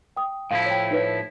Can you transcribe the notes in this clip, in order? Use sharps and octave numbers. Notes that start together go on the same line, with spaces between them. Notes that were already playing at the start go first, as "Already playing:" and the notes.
G5 D#6
A2 F3 E4 F5
C#5 G5
D#4 B4 C#5